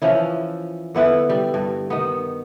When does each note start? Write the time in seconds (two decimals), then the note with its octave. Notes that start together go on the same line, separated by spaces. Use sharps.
0.02 E3 F3 C#4 E4
0.95 D3 B3 E4 B4
1.29 G3
1.54 G2
1.90 D#3 B3